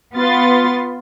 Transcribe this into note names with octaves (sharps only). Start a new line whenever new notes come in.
B3 F4 B4 C6 A6